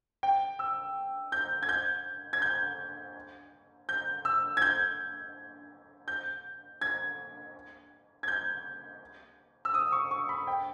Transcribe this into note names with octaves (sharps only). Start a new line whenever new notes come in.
G5
E6
G6
G#6
G6
G#6
G6
G6
E6
G#6
G6
G6
G#6
G#6
G6
E6
D#6
C#6
C#6
B5
G5